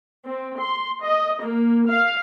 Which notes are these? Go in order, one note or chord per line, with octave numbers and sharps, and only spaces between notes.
C4
C6
D#5
A#3
F5